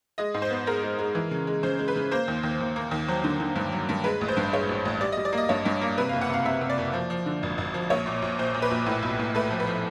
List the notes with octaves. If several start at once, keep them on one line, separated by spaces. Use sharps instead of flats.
G#3 D#5
G#2
C5
B3
G#3 A#4
G#3
G#3
E3
C#3
G#3
C#3 C5
G#3
B4
C#3
A#3 C5
D#2
D#2
D#2
A#3
D#2
F#3 C5
D3
D3
G2
F#3
G2
G#3 B4
A1
C5
G2
G#3 C#5
A1
A1
G3 D5
D#5
G3
D5
A#3 D#5
G2 C#5
G2
A#3
C3 B4
F5
F#1
F#5
C3 F5
C3 E5
C3
D5
F#1
F3
F3
D3
G#1
G#1
F3
A#1 C#5
A#2
A#1
A#2 C5
A#2
B4
A#1
A2
B1
A2
A3 B4
F3
B4
F3